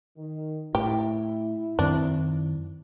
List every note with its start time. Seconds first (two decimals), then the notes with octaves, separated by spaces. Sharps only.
0.18 D#3
0.75 A2 E4 G4
1.79 F#2 D#3 C4 D4